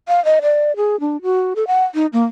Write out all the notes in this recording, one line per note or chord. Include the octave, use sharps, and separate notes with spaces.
F5
D#5
D5
G#4
D4
F#4
A4
F#5
D#4
A#3